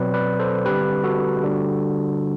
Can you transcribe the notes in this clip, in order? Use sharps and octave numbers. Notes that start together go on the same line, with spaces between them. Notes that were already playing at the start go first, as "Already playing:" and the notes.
Already playing: B2 F#3 C4 B4 D5
B4 D5
A4 C5
D3 G3 C4 G4 B4
F#4 A4
D3 G3 D4